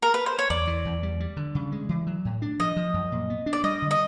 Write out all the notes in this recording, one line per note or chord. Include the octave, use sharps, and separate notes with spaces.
A#4
B4
C5
C#5
E2 D5
E3
E2
G3
G3
D3
C#3
G#3
E3
F#3
A2
D4
F3 D#5
F3
F#2
A#2
B3
D4
D5
G3 D#5
D3
D#5